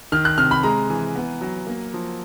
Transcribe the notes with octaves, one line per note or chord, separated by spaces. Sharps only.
D#3 F6
F#6
C3 F6
B5
G#3 A#5
E3
B3
F#3
A#3
F3